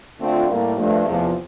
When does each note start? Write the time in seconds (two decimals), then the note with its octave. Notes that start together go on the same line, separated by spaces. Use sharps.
0.19 D3 A3 C4 F4
0.48 A2 G3 A#3
0.76 G2 F3 A3
1.05 E2 C3 F3